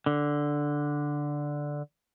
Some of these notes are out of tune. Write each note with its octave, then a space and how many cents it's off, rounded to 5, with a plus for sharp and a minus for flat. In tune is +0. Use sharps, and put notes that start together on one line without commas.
D3 +0